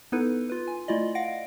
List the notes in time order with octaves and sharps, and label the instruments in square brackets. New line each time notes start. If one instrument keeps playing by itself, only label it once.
[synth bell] B3 D#4 E4 A4 B4
F4 B4
G#5
A3 E4 F4 D5 D#5
F5 F#5 A#6 D7